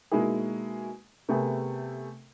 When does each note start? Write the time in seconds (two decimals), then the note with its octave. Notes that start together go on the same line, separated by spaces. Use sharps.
0.12 B2 G#3 A#3 D#4 E4 G#4
1.29 C3 A3 B3 G#4 A#4